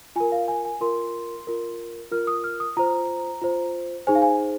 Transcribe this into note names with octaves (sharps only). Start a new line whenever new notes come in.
F4 A#4 G#5
F5
G#5
G#5
F4 A#4 C6
F4 A#4
F4 A#4 F6
D#6
F6
D#6
F4 C5 A#5
F4 C5
D#4 G#4 C5 G#5
F5
G#5